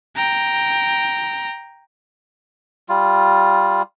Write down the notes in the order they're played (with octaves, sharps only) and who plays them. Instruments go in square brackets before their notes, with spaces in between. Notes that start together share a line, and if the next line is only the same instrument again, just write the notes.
[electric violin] G5 A#5
[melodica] G3 F4